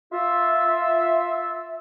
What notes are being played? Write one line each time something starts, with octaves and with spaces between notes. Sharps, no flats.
F4 E5